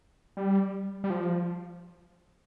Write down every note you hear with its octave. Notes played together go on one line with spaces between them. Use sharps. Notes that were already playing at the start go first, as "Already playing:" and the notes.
G3
G3
F3